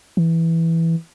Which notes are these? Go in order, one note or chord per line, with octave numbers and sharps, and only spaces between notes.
E3